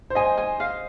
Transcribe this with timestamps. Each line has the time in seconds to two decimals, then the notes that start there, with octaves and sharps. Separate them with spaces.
0.10 C5
0.15 D#5 G#5
0.37 G#5
0.60 F5